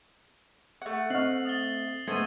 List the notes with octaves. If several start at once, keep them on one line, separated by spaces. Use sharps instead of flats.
A3 F#5
C4 D#5 F6 C7 F#7
D#6 A6 G7
G#3 A3 B3 C5 G#6 D#7